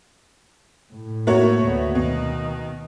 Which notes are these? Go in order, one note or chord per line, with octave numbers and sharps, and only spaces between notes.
A2
A3 A#3 F#4 C#5
D2 B3
B2 D#3